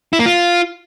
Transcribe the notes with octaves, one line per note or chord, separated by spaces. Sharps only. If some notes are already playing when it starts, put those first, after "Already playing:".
E4
A#3
F4